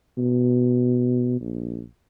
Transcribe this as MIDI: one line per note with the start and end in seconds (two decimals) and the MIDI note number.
0.18 1.37 47
1.41 1.82 34